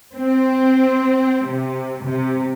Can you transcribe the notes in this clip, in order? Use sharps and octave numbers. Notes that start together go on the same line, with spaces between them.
C4
C3
C3